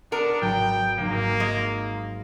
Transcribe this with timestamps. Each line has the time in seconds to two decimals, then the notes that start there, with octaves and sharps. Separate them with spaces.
0.12 B3 D4 A#4
0.41 G#1 F#3 G5 D#7
0.98 G#2 F#3 A#3 D#4
1.40 G#3 C#6